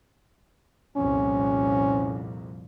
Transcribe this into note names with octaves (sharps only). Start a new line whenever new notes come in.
C2 F2 A#2 C#4